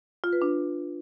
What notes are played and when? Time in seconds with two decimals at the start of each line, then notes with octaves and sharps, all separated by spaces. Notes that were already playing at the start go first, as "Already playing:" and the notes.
0.24 F4
0.33 B4
0.42 D4